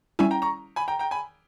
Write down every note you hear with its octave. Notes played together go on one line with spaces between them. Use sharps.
G3 C#4 E4 E5 G#5
G5 A#5
A#5 C#6
G#5 B5
G5 A#5
G5 A#5
G#5 B5